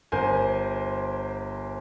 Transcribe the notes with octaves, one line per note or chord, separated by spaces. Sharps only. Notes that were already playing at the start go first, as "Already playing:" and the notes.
G1 A#4 C5 G#5